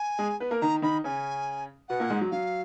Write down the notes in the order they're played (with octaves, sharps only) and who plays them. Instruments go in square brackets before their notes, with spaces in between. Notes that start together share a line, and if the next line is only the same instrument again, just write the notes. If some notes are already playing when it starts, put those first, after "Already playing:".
Already playing: [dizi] G#5
[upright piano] G#3 G#4
B3 B4
A#3 A#4
[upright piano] D#3 D#4 [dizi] A#5
[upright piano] D#3 D#4 [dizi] B5
[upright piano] C#3 C#4 [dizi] G#5
[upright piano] B2 B3 [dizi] F#5
[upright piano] A#2 A#3
G#2 G#3
F#3
[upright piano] F#3 [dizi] F5